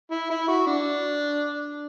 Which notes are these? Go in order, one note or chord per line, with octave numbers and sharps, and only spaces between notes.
E4
E4
F#4
D4